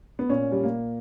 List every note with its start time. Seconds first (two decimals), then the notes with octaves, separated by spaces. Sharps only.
0.19 B3
0.29 A#2 C#4
0.52 G3
0.63 A#3